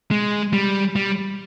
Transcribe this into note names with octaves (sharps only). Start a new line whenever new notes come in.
G#3
G3
G3